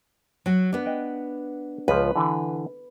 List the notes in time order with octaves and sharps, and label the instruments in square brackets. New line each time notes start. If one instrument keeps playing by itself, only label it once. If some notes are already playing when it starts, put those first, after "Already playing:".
[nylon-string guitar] F#3 F#4
B3 D4
[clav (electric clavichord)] D#5 G5
[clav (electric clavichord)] C#2 F3 [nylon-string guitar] B4
[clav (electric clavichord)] D3 E3